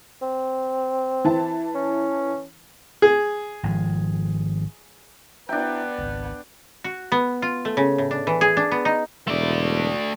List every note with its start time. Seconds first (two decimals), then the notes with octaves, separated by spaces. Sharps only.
0.22 C4
1.25 E3 A5
1.75 C#4
3.02 G#4
3.63 G#1 F3
5.49 B3 D4 E4 E5 G5 A#5
5.98 G#1 C#2 G#2
6.84 F#4
7.12 B3
7.42 F4
7.65 A3
7.77 C#3
7.98 A2
8.11 D4
8.27 E3
8.41 G#4
8.57 D4
8.71 B3
8.85 D#4
9.27 E1 A3 D5